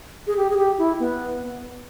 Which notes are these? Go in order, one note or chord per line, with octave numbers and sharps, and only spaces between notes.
G#4
G4
G#4
G4
E4
B3